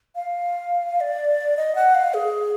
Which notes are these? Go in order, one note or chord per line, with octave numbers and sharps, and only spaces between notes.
F5
D5
D#5
F#5
F5
G#4